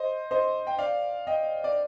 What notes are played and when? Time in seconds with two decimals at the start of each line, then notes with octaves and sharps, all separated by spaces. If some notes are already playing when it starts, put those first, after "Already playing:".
Already playing: C5 D#5
0.31 C5 D#5
0.67 G5
0.78 D5 F5
1.27 D#5 G5
1.64 D5